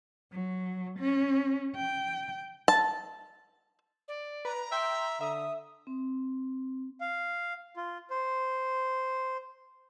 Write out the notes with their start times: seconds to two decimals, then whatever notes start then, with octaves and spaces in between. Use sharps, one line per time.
0.33 F#3
0.99 C#4
1.76 G5
2.68 A5
4.08 D5
4.45 B4 A#5
4.72 E5 G5 C6
5.21 D3 E5 D#6
5.87 C4
7.01 F5
7.77 F4
8.10 C5